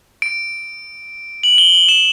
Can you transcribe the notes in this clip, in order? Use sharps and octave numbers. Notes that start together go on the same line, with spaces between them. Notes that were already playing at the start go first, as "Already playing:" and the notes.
D7
F#7
G7
F#7
E7